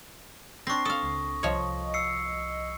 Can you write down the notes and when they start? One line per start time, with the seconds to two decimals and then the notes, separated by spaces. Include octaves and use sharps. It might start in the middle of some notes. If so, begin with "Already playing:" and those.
0.67 C4 D4 C#6 A#6 C7
0.85 A4 F5 D#6
1.03 C#2
1.43 C2 F3 C#5 D#5
1.94 E6 C7 C#7